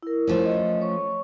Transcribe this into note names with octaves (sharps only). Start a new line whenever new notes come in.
E4 A#4
F3 A3 C#4
D#5
C#5 C#6